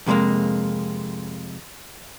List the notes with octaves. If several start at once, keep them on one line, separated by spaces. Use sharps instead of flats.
F2 C3 G3 G#3 A#3